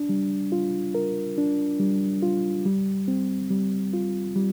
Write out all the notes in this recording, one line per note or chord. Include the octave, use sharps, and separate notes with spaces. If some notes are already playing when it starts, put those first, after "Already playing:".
Already playing: D4
G3
F4
A#4
D4
G3
F4
G3
C4
G3
F4
G3